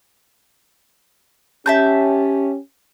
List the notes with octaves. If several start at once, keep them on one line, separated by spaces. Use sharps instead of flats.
C#4 G4 E5 A5 G6